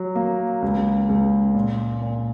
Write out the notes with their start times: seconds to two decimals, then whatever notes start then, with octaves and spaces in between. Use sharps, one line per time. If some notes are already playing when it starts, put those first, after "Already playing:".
Already playing: F#3
0.15 A#3
0.62 C#2
1.09 C#2
1.54 A#2
2.02 A#2